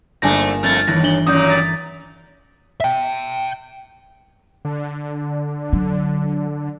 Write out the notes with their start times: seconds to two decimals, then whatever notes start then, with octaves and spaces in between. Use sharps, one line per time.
0.22 G1 G#2 A3 A#3 D4 G#5 A#6
0.63 F2 A3 F6 A6
0.87 D#2 E3 A#6
1.04 D4 F#7 G7
1.26 F#2 A#2 D#3 D#6 G6
1.49 A#5 A6 B6
2.81 E5 G5
4.65 D3
5.73 F#3